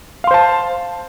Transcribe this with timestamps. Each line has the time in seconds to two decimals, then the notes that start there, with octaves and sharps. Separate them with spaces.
0.24 F5
0.27 C6
0.31 C5
0.34 A5